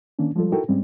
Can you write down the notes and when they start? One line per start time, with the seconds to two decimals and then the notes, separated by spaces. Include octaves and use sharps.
0.19 D#3 A#3 C#4 D4
0.36 F3 G3 G#3 F4 A4
0.52 D#4 E4 F#4 A4 A#4 G5
0.68 G#2 G3 G#3 C4 C#4